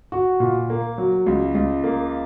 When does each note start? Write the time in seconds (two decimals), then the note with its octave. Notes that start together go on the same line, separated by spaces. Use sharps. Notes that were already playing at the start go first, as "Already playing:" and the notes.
0.12 F#4
0.40 A#2
0.70 A#3
0.98 F#3
1.26 C#2
1.55 C#2
1.84 A#3